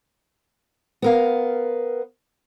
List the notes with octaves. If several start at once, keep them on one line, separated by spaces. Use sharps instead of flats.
B3 A#4 F5